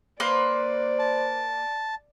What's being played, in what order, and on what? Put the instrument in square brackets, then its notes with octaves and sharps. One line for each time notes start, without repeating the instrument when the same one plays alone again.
[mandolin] A#3 B4 C6 [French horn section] C5 [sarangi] D5
[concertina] A5